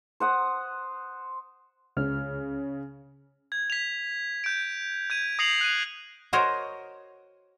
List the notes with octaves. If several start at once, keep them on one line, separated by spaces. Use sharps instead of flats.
C5 F#5 D#6
C#2 C#3 F6
G#6
B6 F7
G6 D7
G6 G#6 D#7
D#6 A#6 C7 C#7 F7 F#7
F#6 D#7
F#4 A#4 C5 C#5 D#5